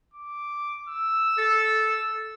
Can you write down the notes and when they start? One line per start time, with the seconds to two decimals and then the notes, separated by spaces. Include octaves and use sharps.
0.13 D6
0.89 E6
1.38 A4